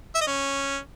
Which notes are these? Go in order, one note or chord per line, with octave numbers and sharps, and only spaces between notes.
E5
D#5
C#4